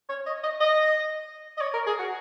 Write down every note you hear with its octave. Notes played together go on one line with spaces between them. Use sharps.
C#5
D#5
D#5
D#5
D#5
C#5
A#4
G#4
F#4